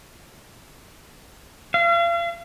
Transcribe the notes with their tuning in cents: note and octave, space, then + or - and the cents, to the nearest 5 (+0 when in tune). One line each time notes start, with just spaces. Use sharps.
F5 -40